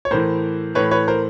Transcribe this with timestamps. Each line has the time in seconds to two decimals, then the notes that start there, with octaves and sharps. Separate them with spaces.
0.05 C#5
0.11 A2 E3 A#4 C5
0.75 A2 E3 B4 C#5
0.91 B4 C#5
1.08 A#4 C5